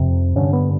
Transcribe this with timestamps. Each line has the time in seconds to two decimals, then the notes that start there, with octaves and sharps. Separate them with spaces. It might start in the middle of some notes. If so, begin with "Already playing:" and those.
Already playing: F2 C3
0.36 G2 D3 C#4
0.53 B3